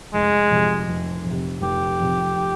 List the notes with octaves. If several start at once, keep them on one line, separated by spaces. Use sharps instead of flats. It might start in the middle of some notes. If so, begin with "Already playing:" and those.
F1 G#3
F2 C3
F1
F2
C3
F1 G4
F2 C3